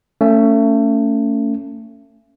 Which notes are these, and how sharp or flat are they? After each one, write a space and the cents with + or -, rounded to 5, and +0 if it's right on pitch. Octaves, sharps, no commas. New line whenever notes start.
A3 +30 C#4 +10